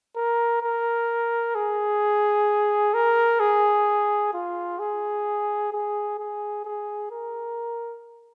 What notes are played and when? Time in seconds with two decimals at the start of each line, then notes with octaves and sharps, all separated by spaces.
0.16 A#4
0.62 A#4
1.55 G#4
2.94 A#4
3.40 G#4
4.34 F4
4.79 G#4
5.73 G#4
6.19 G#4
6.65 G#4
7.12 A#4